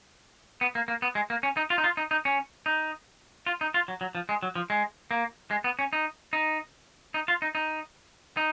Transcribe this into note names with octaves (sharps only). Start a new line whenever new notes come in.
B3
A#3
A#3
B3
G#3
A#3
C#4
D#4
F4
D#4
F4
D#4
D#4
C#4
D#4
F4
D#4
F4
F#3
F#3
F3
G#3
F#3
F3
G#3
A#3
G#3
B3
C#4
D#4
D#4
D#4
F4
D#4
D#4
D#4